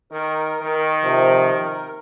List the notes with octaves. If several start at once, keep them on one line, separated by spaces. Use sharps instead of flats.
D#3 A#4
D#3
C3 F3
A#4